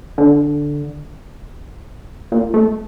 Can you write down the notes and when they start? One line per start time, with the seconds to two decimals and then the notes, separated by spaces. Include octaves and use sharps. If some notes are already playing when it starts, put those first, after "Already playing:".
0.18 D3
2.32 A#2
2.54 A3